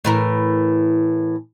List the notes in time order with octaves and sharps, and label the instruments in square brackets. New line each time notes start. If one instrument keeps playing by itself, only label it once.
[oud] A2 E3 A#4